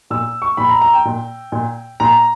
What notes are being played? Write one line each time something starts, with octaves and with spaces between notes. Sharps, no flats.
A#2 E6
C#6
A#2 B5
A#5
A#5
G5
A#2
A#2
A#2 A#5